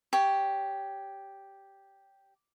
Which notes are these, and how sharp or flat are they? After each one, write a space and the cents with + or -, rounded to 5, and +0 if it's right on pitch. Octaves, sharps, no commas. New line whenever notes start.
G4 +0 C#5 +10